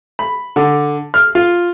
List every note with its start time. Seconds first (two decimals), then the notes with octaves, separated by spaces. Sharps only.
0.19 B5
0.56 D3
1.14 F6
1.35 F4